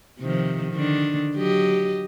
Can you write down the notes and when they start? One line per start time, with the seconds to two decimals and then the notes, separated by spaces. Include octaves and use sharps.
0.20 C3 D#3 F3
0.73 D3 D#3 D4
1.35 F#3 G4 D#5